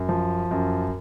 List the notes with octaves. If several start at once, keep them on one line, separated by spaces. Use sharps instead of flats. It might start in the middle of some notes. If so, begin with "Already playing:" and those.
Already playing: F#2
F3
F#2